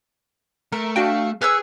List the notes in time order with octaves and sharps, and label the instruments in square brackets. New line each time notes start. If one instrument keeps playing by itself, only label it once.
[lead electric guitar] A3 [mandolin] A#4
[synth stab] D4 F#4 G5 [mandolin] F5
[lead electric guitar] G#4 [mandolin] B4 C#5 E6 [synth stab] F6